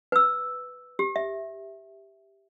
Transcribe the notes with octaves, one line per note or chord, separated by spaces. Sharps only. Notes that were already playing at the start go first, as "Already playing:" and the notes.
B4 E6
G4
E5